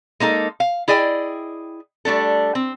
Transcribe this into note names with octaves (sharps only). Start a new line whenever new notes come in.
G#3 A#3 D#4 A4
F5
E4 G#4 D5 D#5 G5
G3 A3 D4 A4
C4